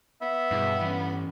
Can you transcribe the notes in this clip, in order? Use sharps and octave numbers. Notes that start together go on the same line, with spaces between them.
B3 E5
G2 B2 E4 G#4
E3 C#4